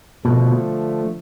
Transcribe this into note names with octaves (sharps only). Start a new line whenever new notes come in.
B2 D3 F3 A3